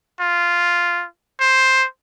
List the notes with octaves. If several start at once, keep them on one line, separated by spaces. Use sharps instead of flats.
F4
C5